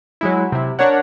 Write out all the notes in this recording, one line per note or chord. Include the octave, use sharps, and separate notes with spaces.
F#3 G#3 E4
C3 E4
D4 A#4 C#5 F#5